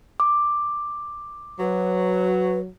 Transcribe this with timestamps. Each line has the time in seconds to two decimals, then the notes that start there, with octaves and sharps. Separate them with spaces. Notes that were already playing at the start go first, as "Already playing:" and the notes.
0.20 D6
1.60 F#3 B4